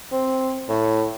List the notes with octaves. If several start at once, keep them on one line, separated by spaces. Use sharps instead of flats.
C4
A2